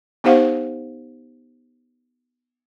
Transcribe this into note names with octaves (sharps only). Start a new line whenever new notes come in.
B3 D#4 G4 C5 F5 F#5